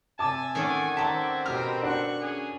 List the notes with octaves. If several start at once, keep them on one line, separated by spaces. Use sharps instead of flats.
C3 G#5 A5 D6 E6 A6
D#3 C#4 A4 D5 F#5 G#6
C4 A4 E5 A5 A#5
B2 G4 A#4 G5 D#6 F6
D4 F#4 C#6 F#6
C#4 G#4